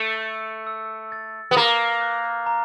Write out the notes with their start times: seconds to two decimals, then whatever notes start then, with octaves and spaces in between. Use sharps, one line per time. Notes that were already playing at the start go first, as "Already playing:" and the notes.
Already playing: A3 E6
0.22 C#7
0.67 E6
1.12 A6
1.51 B3
1.56 A#3 A#5
2.01 F#6
2.46 A#5